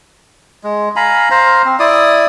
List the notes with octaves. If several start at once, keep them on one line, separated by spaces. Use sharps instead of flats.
G#3
F5 G#5 A#5 B5
C5 F5 A#5
C4
E4 D5 D#6